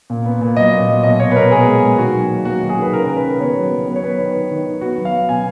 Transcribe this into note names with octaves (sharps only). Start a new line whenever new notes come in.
A#2
B3
A#2
F#3 D#5
A#2
F#3
B2 D#5
B2 C#5
B4
B2 A#4
B3 G#4
G#3
G#3
D#3 F#4
F#3
A#3
F#3 F#4
D#3
G#4
D#3 B4
C#3 A#4
C#3
B4
C#3
B3 C#5
F#3
F#3
B3 B4
C#5
B3 B4
D#3
D#3
D#3
D#3
B3 F#4
F#3
F5
F#3
B2 G#5